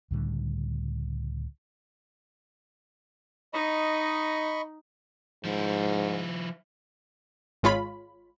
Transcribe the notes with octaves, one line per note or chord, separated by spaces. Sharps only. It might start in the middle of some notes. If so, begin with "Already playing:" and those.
C#2 A2 D3 G3
D#4 D#5 B5 C#6
G#2 F3 E4
G#1 G#3 F4 C#5 B5